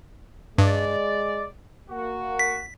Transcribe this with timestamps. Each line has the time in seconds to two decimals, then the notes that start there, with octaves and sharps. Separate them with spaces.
0.58 G2 G#3 D5
1.89 A#3 F#4
2.39 B6